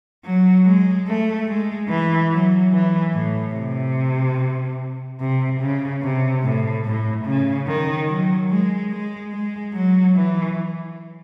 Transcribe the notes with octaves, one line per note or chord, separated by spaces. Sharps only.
F#3
G#3
A3
G#3
E3
F#3
E3
A2
C3
C3
C#3
C3
A2
A2
C#3
D#3
F#3
G#3
G#3
G#3
F#3
E3